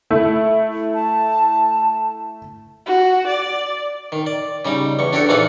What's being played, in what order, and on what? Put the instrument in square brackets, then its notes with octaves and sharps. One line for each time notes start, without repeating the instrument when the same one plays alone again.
[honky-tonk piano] A3 E4
[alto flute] A5
[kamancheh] F#4
D5
[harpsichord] D#3
D5
C#3 G3 D#4
E2 C#6
D4 F#4 G4 A4 C#5
A#1 E3 D#4 F4 A4 F#5